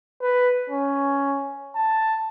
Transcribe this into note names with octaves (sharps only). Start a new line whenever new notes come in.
B4
C#4
A5